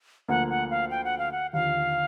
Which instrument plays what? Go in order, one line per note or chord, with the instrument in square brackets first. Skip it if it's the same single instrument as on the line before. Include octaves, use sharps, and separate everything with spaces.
[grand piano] D2 D3 F3 A#3 [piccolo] F#5
[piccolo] F#5
F5
G5
F#5
F5
F#5
[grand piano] D#2 D3 F3 [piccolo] F5